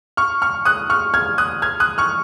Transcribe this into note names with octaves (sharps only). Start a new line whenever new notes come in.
C#6 F6
C#6 F6
D#6 F#6
C#6 F6
F6 G#6
D#6 F#6
F6 G#6
D#6 F#6
C#6 F6